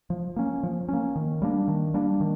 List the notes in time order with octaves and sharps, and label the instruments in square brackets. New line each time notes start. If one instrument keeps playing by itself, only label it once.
[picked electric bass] F3
A#3 C#4
F3
A#3 C#4
D#3
G3 A#3 D4
D#3
G3 A#3 D4
D#3